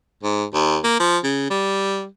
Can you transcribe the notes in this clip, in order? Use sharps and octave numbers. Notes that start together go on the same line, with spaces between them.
G#2
D#2
A#3
F3
C#3
G3